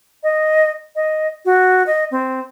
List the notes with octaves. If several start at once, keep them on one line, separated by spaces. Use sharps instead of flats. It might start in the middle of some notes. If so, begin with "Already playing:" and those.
D#5
D#5
F#4
D#5
C4